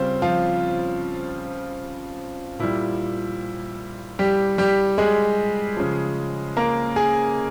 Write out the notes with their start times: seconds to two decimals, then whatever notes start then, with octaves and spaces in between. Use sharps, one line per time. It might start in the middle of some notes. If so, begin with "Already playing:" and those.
Already playing: C#3 G3 C4 F4 C5
0.22 F3 F4
2.59 A#2 G3 E4
4.19 G3 G4
4.58 G3 G4
4.98 G#3 G#4
5.77 C#3 F3
6.57 A#3 A#4
6.96 G#4 G#5